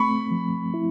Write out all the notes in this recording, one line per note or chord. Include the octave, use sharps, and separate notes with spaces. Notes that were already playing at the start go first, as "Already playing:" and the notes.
Already playing: A3 C4 B5 C#6
F3
E4